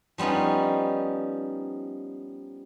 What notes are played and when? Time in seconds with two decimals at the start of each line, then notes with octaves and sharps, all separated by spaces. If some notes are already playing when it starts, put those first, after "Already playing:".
0.18 F3 G3 B3 C#4 D#4